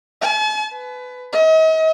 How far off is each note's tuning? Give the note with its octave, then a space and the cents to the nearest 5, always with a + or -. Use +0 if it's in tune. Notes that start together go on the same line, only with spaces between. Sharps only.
A5 -45
B4 +20
D#5 +40